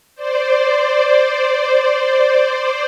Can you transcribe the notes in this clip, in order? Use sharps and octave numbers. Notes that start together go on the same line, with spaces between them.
C5 D5
C5 D5
C5 D5